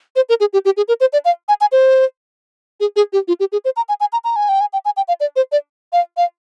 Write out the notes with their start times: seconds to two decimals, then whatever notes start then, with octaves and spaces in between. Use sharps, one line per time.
0.16 C5
0.29 A#4
0.40 G#4
0.53 G4
0.65 G4
0.77 G#4
0.88 A#4
1.00 C5
1.13 D5
1.25 F5
1.48 G#5
1.61 G#5
1.72 C5
2.80 G#4
2.96 G#4
3.13 G4
3.28 F4
3.40 G4
3.52 G#4
3.65 C5
3.77 A#5
3.89 G#5
4.00 G#5
4.13 A#5
4.24 A#5
4.36 G#5
4.49 G5
4.61 G#5
4.73 G5
4.85 G#5
4.97 G5
5.08 F5
5.20 D5
5.36 C5
5.52 D5
5.93 F5
6.17 F5